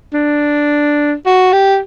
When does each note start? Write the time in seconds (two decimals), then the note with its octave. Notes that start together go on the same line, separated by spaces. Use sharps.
0.13 D4
1.26 F#4
1.53 G4